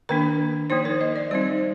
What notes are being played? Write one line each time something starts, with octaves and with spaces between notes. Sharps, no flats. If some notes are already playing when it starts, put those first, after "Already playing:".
D#3 A#3 D4 A#4
F3 A#3 D#4 C5
A#4
D#5
D5
G3 C4 D#4 C5